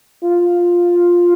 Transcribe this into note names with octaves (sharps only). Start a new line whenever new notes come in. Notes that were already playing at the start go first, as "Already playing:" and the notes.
F4